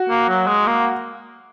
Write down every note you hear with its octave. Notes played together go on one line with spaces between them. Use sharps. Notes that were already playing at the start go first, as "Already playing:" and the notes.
Already playing: F#4
A#3
F#3
G#3
A#3